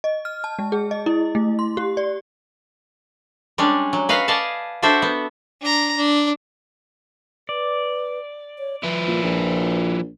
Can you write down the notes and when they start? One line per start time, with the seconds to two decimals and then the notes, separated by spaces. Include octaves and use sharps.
0.04 D#5
0.25 F6
0.44 A5
0.59 G#3
0.72 G#4
0.91 D#5
1.06 E4
1.35 A3
1.59 C6
1.77 G4
1.97 D5
3.58 G3 G#3 C#4 D4
3.93 F#3
4.09 F#4 B4 D#5 F5
4.28 D5 D#5 F5 G#5 A5
4.83 D4 F#4 A4 C5 E5
5.02 B3
5.61 D4 A#5
5.97 D4
7.49 B4 D5
8.59 C#5
8.83 F3 E4 B4
9.07 A#2
9.23 A#1